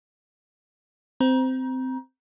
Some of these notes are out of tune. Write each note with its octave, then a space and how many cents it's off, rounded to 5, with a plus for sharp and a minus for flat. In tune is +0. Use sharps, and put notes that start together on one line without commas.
C4 -15 A#5 +30